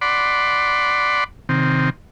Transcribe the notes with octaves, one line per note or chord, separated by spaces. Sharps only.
D5 F#5 B5 C6 D6
C3 D#3 C4